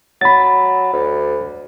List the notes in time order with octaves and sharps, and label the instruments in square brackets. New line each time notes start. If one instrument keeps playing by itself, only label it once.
[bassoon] F#3 [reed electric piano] B5 A6
[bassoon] D2